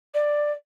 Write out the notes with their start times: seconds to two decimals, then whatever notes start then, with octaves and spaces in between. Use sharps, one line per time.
0.14 D5